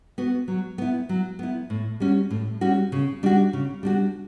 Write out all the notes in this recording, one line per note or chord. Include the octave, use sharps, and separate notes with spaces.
B3 F#4
F#3
B3 E4
F#3
B3 E4
A2
G3 C#4 F#4
A2
G3 C#4 F#4
C#3
G3 D4 F#4
C#3
G3 D4 F#4